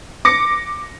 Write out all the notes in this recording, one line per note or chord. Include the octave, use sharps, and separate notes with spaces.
D6 A#6 C#7